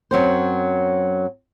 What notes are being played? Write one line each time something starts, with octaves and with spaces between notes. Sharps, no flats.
F#2 F#3 C4 C5